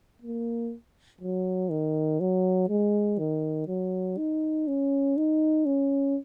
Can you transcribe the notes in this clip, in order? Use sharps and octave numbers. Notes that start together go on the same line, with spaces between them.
A#3
F#3
D#3
F#3
G#3
D#3
F#3
D#4
C#4
D#4
C#4